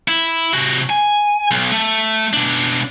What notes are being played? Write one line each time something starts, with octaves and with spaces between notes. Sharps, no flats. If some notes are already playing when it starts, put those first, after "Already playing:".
E4
C3 F#4
G#5
B1
A3
B2 D4